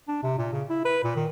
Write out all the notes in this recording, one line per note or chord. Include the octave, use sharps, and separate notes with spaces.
D4
C3
A#2
C#3
E4
B4
A#2
D#3